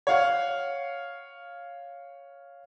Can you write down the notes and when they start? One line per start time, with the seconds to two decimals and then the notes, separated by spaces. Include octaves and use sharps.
0.07 C#5 F5 F#5